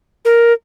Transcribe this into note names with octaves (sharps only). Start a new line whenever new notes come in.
A#4